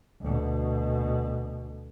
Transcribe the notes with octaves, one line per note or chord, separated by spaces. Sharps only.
D2 B2